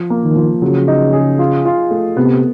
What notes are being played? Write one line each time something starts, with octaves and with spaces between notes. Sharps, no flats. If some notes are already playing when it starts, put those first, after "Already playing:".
Already playing: F3
A#3
D#3
F3
C#3 F#3
D#4
G#4
F4
F4
A3
C3 B3